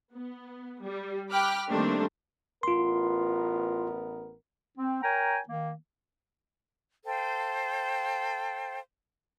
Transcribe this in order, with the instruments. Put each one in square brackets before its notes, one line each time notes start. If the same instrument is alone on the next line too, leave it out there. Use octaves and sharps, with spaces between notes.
[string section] B3
G3
G5 B5 D6 F6 F#6
D#3 G3 A3 A#3 C4 D4
[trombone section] A1 B3 A#4 [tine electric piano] F4 C6
[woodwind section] C4
A#4 C#5 G5 G#5 A#5
D#3 A#3
[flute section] A4 C5 F5 G5